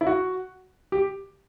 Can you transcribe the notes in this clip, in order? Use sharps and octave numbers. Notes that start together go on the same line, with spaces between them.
E4
F#4
G4